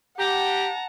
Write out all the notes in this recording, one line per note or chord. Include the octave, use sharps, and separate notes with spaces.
G4 F#5 A5 A#5